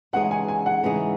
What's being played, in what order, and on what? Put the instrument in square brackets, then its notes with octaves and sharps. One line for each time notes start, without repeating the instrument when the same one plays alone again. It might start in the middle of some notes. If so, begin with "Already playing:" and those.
[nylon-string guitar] C#3 E3 G#3 D#4 G#4 [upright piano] F#5
[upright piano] G#5
G#5
F#5
[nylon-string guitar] C#3 E3 G#3 D#4 G#4